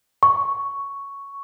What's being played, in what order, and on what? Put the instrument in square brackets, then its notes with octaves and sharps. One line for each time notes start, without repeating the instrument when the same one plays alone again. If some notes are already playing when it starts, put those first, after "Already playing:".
[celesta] C#6